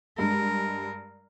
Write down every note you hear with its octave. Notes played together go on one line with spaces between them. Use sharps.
G2 G#3 A#4